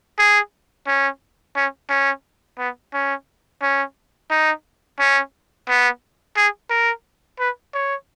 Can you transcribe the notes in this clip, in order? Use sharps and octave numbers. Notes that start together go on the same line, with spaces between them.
G#4
C#4
C#4
C#4
B3
C#4
C#4
D#4
C#4
B3
G#4
A#4
B4
C#5